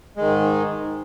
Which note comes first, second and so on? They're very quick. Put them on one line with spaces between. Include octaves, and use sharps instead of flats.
G#3 D#3 G#2